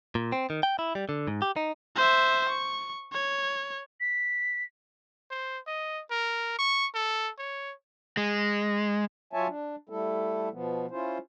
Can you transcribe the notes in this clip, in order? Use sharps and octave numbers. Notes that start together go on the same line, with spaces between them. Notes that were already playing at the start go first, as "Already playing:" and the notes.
A#2
C4
D#3
G5
E4
G3
D3
G#2
G4
D#4
C5 E5
C#6
C#5
B6
C5
D#5
A#4
C#6
A4
C#5
G#3
F#3 F4 C#5 E5 G#5 A5
D4
G3 A3 E4 A4
B2 F3 B3
C#4 E4 F4 C5